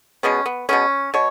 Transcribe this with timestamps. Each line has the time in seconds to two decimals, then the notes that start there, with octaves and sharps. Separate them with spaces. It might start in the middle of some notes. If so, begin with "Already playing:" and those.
0.23 B2 G#3 B3 C#4
0.46 B3
0.69 B2 G#3 B3 C#4
1.14 B2 C#5